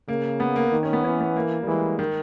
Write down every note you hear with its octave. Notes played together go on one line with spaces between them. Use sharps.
C#3 A#3
B3
A#3
D#3
C#4
B3
E3 C#4
B3
A#3
G3
E3 G#3
D#3